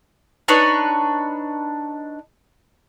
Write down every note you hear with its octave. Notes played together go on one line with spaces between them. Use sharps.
D4 D#4 B4 C#5